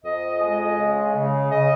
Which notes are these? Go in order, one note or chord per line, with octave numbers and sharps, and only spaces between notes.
F2 D#5
G#3
C#3
C#3
C#3 D#5